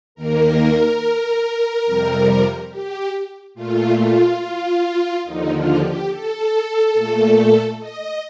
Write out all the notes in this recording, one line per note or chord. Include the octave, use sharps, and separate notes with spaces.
D#2 D#3 A#3 A#4
F2 C3 G3
G4
A#2 A3 F4
F4
F4
D#2 D3 F3 D#4
F4
G4
A4
A#2 A3
D#5